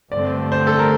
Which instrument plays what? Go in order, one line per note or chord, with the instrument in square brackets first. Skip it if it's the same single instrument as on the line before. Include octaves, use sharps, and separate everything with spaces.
[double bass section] G2 D3 A3 C4 [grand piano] D5
[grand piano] C5
A4
A#4